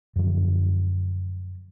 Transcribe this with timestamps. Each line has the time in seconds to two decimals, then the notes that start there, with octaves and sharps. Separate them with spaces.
0.16 F#2 D3 F3 F#3